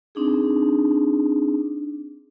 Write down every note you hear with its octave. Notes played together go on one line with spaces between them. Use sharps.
C4 D4 D#4 G#4